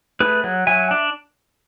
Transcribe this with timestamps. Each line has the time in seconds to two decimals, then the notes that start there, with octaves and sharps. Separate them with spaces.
0.20 A3 G#4 B4
0.44 F#3
0.67 F#3 E5 G#5
0.91 D4